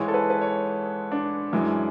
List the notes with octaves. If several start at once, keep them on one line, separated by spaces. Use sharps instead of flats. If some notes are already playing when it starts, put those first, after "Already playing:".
Already playing: G#2 E3 G#3 C#5
A4
B4
B4
C#5
D4
F#2 E3 G#3